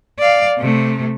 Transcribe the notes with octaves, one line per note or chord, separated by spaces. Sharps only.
D5 F5
C3 A3